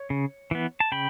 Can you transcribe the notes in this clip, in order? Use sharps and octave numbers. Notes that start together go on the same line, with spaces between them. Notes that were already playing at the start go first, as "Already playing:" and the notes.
Already playing: C#5
C#3
E3 B3
A5
C#3 G5 B5